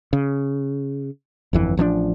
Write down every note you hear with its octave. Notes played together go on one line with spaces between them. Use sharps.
C#3
G1 F2 E3
A1 F3 A#3 D4